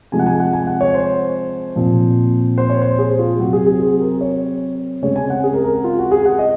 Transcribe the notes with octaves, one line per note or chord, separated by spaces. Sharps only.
C3 F3 G#3 G#5
F#5
G#5
F#5
G#5
F#5
C#5
C5
A#2 F3 C4
C5
C#5
C5
G#4
F4
C3 F#3 C4 F#4
G#4
G#4
G#4
A#4
C#5
C#3 G#3 C4 C#5
G#5
F#5
G#4
A#4
A#4
F4
F#4
G#4
F#5
D#5